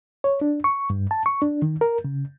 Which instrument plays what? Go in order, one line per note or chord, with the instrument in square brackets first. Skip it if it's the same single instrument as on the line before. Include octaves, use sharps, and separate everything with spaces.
[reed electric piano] C#5
D4
C#6
G2
A5
C#6
D4
D#3
A#4
C#3